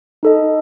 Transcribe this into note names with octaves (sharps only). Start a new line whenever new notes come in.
D#4 A4 D#5